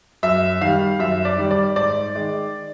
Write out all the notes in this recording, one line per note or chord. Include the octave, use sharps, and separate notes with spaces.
F#2 E5
D#3 G3 F5
F#2 E5
D5
D#3 G3
D5
G#2 D5
D#3 G#3